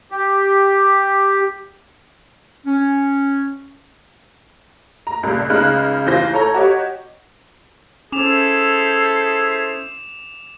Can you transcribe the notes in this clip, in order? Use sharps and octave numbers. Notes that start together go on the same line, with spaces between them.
G4
C#4
A#5
C#2 G2 A#2
C#2 C#3 D#4 F6 F#6
D#2 E3 F4 C5 G6 A#6
A4 C#5 A#5
F#4 G4 C#5 D#5
C#4 E4 G#4 A4 C5 D6 E7 F7